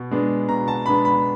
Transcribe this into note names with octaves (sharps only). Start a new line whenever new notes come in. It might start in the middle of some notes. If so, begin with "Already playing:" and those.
Already playing: B2
G#3 B3 D4
B2 A#5
A5
G#3 B3 D4 B5
B5